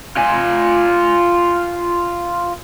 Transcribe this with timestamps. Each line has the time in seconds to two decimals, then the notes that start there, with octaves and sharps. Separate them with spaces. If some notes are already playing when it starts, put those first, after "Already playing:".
0.17 F4 G#5